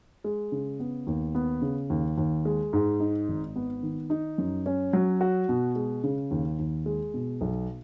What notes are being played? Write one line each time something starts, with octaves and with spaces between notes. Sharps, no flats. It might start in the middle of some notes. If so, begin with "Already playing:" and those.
G#3
C#3
B3
D#2
B3
C#3
D#2
D#2
G#3
G#2
D#4
G#1
B3
D#3
D#4
F#2
C#4
F#3
F#4
B2
G#3
C#3
D#2
D#2
G#3
B2
B1